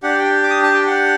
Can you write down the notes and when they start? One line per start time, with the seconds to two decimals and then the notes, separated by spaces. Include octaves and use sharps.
0.03 D4 G4 F#5
0.19 G5
0.43 D6
0.50 D#6
0.63 A5
0.74 G5
0.86 F#5